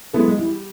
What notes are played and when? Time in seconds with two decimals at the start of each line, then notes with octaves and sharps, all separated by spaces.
0.13 F#3 G#3 B3 E4 A4
0.28 G#3
0.38 E3 G3